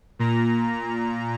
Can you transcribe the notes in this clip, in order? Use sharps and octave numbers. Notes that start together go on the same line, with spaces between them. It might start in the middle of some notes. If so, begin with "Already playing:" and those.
A#2 A#5